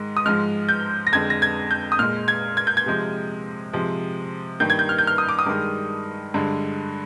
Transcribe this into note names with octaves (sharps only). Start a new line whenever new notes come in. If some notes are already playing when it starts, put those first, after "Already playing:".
Already playing: G#2 D#3 G#3
D#6
G#2 F3 G#3 F6
G6
A#6
F2 D3 G#3 G#6
A#6
G#6
G6
D#6
A#2 G#3 F6
G#6
G#6
G6
G#6
C3 F3 G#3
C3 F3 G#3
G2 D#3 A#3 G6
G#6
G6
F6
G6
F6
D#6
D6
D#6
G2 D#3 G#3
G2 D3 G#3